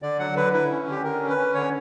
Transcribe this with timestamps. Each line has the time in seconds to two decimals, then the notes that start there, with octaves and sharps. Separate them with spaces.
0.02 D3 D5
0.19 F#3 F#5
0.36 D3 B4
0.53 E4 B4
0.70 C#4
0.87 D3 G4
1.04 D3 A#4
1.20 C#4
1.29 B4
1.38 C#4
1.54 D3 C#5